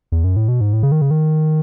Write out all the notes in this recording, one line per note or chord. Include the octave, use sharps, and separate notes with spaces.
E2
F#2
A2
B2
G#2
A2
C#3
D#3
C#3
D#3